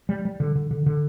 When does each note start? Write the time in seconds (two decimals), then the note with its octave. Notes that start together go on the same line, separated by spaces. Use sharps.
0.09 G3
0.25 G3
0.40 D3
0.55 D3
0.71 D3
0.86 D3